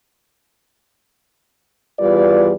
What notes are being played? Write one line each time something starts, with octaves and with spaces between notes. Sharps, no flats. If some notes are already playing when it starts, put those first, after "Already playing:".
E2 G3 F4 B4 D5